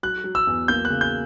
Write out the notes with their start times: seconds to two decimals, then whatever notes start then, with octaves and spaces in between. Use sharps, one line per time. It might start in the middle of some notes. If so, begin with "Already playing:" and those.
0.03 F#3 F#6
0.24 F#3
0.35 E6
0.47 E2
0.68 A#3 G6
0.85 F#6
0.90 C#3
1.01 G6